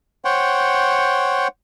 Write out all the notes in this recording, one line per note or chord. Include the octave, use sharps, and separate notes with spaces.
C5 C#5 F#5 G5